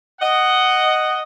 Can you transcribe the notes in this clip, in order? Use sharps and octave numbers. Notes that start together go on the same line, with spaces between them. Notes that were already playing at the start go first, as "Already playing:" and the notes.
D#5 F#5